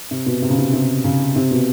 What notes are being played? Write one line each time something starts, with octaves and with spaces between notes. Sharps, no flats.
C3
B2
C3
C#3
C3
C3
C#3
C3
B2